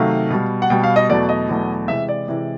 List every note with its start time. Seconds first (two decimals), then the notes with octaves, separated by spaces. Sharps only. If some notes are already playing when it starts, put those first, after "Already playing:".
Already playing: C3 D#3 F#3 A3 F5
0.30 B2 G3
0.62 F#5
0.70 B2 G3 G5
0.84 F5
0.96 D#5
1.09 E2 B2 F#3 A3 D5
1.29 D#5
1.49 E2 B2 F#3 A3
1.88 C3 E3 G#3 E5
2.09 D5
2.28 C3 E3 G#3